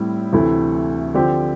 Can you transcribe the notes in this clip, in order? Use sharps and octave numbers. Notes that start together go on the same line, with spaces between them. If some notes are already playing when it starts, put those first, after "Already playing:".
Already playing: A2 G3 C4 E4
D2 C3 E3 A3 E4
D3 F3 C4 G4